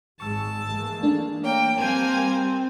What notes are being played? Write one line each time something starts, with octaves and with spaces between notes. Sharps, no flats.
G#1 G#2 G#3 A5 C#6 E6
E3 G#3 A#3
A3 D4
A#3 C#5 G5
G3 A#3 C4 G#5 A5 G6